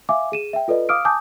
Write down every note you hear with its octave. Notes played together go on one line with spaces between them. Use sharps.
E5 F5 G#5 D6
G#4 D#7 E7
E5 G5
F4 A4 B4 D5 D#5
F5 D6 D#6 F6 D7
G#5 A5 D6 D#6 G6